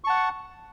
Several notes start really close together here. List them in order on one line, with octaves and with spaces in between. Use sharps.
C#6 A5 F#5